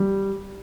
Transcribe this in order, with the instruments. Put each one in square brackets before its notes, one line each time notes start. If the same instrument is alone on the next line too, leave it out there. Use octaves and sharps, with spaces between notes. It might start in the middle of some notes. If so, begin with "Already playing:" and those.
Already playing: [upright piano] G3